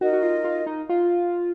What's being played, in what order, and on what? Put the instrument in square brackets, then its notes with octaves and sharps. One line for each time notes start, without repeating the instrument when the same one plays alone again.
[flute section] D#4 A#4 D#5 [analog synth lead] F#4
[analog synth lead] F#4
F4
F4
D#4
F4